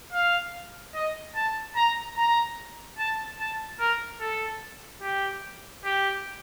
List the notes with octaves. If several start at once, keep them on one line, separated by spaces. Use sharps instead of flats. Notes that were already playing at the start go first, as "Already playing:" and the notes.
F5
D#5
A5
A#5
A#5
A5
A5
A#4
A4
G4
G4